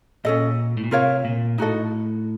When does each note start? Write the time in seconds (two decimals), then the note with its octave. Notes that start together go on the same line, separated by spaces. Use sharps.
0.25 A#2 C#4 A4 D#5
0.77 A2
0.84 A#2
0.91 C3 F4 A#4 C#5 F5
1.25 A#2
1.58 A2 D#4 F#4 A4 D#5